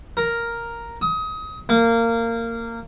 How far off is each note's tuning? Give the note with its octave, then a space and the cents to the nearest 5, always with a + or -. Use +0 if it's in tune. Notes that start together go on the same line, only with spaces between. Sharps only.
A#4 +0
D#6 +25
A#3 -20